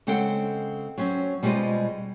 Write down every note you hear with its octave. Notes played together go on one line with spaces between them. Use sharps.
C#3 G#3 C4 A4 F#5 G5
F#3 C4 C#4
B2 G3 G#3 F4 C5 D#5